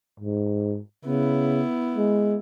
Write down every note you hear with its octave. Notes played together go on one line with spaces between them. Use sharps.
G#2
C#3 B3 E4
G#3